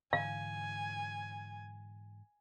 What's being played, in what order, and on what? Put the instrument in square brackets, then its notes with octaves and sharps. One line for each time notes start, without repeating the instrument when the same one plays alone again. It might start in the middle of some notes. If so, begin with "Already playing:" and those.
[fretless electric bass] G#2 D3 E3 [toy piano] F5 [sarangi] G#5